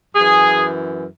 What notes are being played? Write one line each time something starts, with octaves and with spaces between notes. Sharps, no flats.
F#2 E3 G#4